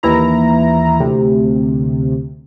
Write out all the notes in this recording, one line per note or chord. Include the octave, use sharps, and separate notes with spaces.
D#2 E3 E4 A#5
D2 C3